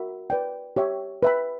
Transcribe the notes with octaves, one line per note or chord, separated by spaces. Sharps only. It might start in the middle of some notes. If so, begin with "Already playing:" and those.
Already playing: F#4 A#4 E5 B5
B4 D5 G5
G4 C#5 E5 G5
B4 E5 G5 B5